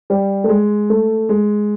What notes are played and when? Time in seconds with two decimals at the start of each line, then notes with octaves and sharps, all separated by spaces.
0.10 G3
0.44 A3
0.49 G#3
0.90 A3
1.29 G#3